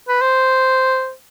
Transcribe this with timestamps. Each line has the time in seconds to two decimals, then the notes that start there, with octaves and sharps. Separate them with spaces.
0.08 B4
0.22 C5